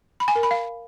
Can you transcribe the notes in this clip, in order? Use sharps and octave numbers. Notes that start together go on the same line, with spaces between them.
B5
G#5
A#4
B5
F5